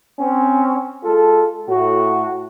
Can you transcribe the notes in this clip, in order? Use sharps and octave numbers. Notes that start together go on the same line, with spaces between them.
C4 C#4
G#3 F4 A4
A2 F#4